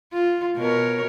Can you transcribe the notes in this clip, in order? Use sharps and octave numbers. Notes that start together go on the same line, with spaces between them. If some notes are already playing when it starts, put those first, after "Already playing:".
F4
B2 A#4 C#5